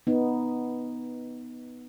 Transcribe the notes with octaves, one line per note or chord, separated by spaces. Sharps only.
B3 D#4